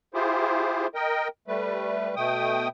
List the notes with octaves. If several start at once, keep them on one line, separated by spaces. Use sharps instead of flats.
E4 F4 G4 G#4 C5
A#4 D#5 G5
G3 A3 B4
B2 A3 G5 D#6